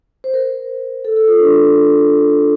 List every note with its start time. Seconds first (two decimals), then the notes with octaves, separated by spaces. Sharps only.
0.24 C5
0.34 A#4
1.05 A4
1.16 A4
1.28 F4
1.40 D4